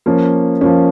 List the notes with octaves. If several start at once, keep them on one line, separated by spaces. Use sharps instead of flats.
F3 A#3 C#4
F3 A#3 C#4